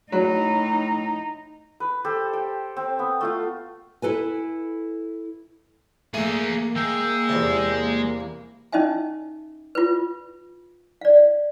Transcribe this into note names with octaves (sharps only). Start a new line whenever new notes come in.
A2 F#3 D#4
B4
G4 A4 C5
G5
C4
B3
A3 F4 F5
E4 A4 B4 G#5
A3 A#3 G#4 E5
G#3 G5 E6
E2 C3
C#4 D#4 D#5 E5 G#5
F4 B4
D5 F5